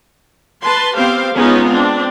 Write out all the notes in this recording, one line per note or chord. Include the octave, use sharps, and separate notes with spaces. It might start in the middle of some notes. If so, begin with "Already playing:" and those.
B4 A5 C6
B3 C4 G4 C5 F5
G#3 B3 C#4 D#4 F4 G#4
C4 D4